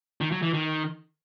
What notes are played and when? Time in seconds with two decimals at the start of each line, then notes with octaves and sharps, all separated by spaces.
0.21 D#3
0.32 F#3
0.43 E3
0.54 D#3